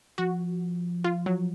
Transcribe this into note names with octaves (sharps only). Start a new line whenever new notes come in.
F3 F#4
F4
F#3